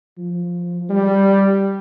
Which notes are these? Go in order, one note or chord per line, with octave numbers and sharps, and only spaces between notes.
F3
G3